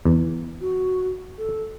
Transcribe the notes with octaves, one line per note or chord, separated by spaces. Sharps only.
E2
F#4
A4